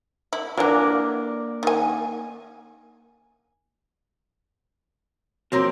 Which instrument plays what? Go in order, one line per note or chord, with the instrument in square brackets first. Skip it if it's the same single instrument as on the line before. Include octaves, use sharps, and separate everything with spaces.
[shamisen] E4
[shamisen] D3 E3 [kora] A#3 D4 A#4
[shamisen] D#3 G#5
[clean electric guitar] F2 [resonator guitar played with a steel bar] A#3 C4 A#4 [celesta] F#4 C#5 C6